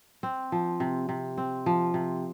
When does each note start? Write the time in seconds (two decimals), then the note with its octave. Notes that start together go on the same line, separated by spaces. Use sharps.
0.23 C4
0.52 F3
0.80 C3
1.09 C3
1.38 C4
1.66 F3
1.94 C3